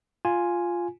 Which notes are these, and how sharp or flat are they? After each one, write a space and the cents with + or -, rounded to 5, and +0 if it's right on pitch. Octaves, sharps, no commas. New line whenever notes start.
F4 +0 G#5 +0